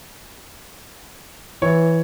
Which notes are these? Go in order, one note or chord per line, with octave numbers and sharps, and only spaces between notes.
E3 C#5